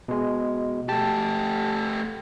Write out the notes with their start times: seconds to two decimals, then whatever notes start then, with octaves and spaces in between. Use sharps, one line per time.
0.08 B2 G#3
0.89 A3 G4 A5